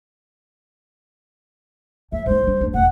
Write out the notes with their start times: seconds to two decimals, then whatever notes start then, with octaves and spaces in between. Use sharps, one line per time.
2.12 F3 E5
2.26 G#3 D#4 C5
2.43 G3 D4
2.61 A3 D4
2.74 E1 F#5